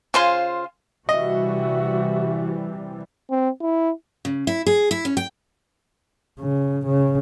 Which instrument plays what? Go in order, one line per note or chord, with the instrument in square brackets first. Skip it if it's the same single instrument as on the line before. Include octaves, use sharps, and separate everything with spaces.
[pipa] C#3 G#5 C6 [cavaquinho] F4 C5 F5
[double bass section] C3 E3 G3 [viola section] F#4 [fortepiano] D#5 [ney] E5
[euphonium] C4
E4
[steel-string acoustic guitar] C#3
E4
G#4
E4
C#4
G5
[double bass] C#3
C#3